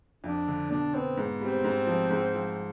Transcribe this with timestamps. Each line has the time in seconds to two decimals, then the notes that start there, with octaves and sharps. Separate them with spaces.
0.24 F2 D4
0.48 D3
0.70 B2 D4
0.94 B3 C4
1.17 G#2
1.41 G3 C4
1.64 G#2
1.87 F3
2.11 G#2
2.34 F3